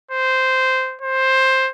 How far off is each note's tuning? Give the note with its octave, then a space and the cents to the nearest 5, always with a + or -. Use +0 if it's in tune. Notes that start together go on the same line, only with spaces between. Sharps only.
C5 -10
C5 +10